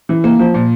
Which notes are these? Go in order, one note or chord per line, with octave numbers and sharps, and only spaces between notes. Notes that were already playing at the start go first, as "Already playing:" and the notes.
E3
A#3
F3
A#2